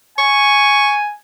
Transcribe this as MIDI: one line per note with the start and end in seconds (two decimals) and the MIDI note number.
0.18 1.15 80
0.18 0.94 85